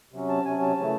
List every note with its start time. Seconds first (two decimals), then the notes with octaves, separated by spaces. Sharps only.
0.12 C3 F#3 C#4
0.29 A5
0.45 C3 F#3 C#4 G#5
0.62 A5
0.78 C#3 E3 A3